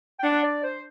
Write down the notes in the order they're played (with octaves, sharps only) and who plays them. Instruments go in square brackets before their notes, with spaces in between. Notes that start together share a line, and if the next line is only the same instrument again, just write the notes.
[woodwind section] G5
[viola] D4 [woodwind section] F#5
[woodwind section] D5
C5